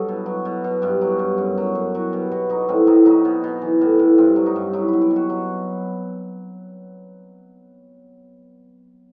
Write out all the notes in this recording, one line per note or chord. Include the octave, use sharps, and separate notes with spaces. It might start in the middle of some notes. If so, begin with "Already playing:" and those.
Already playing: G2 F#3 A4 D#5
B2
F#3
B2
B2
G2 G4
F#3
G2
F#2
F#3
F#2
F#3 F#4
B2 G4
B2 F#4
F#3 D#4
A2 C4
A2 D#4
F#3 D#4
B2
B2
E3
A2
A2
G2 C4
F#3
D#4
G2
F#3 E4
E4
B2
G4
B2
F#4
F#3